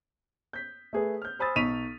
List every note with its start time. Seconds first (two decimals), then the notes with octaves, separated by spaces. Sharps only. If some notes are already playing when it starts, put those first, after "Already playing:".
0.53 G6 B6
0.93 A3 G#4 B4
1.22 F6 G6
1.39 C5 G#5 B5 D#6 E6 A6
1.56 B1 D#4 C#6 B6 D#7 F7